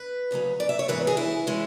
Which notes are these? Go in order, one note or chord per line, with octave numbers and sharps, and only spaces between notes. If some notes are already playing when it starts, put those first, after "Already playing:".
Already playing: B4
D2 C#3 F#3 C#4
D5
E5
C#5
G#2 E3 B3 B4
G#4
E4
E3 G#3 C#4